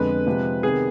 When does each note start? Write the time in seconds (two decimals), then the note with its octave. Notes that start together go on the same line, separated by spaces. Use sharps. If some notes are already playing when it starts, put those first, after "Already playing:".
Already playing: F2 D3 G#3 B3 B4
0.26 C3 F3 G#3
0.63 C3 D#3 B3 G#4